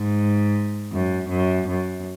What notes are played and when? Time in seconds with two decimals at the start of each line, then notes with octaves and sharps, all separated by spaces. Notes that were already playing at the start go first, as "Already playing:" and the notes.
Already playing: G#2
0.92 F#2
1.29 F#2
1.68 F#2